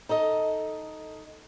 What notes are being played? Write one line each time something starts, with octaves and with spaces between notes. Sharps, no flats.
D#4 A4 D#5